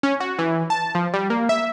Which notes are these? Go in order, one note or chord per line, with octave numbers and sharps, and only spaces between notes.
C#4
F#4
E3
A5
F3
G3
A#3
E5